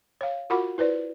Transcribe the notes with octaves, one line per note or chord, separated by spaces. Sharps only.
C#5 F5
F4 F#4 A#4 F#5 B5 D6
E4 B4 C5 D5